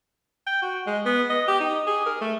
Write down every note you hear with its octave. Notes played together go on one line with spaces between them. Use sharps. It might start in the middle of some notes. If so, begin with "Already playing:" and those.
G5
F#4
G#3
B3
D#5
G4
D#4
G#4
A#4
A3